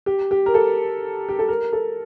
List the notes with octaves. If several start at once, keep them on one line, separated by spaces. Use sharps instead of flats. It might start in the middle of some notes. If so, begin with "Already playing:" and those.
G4
G4
A#4
A4
G4
A4
A#4
A4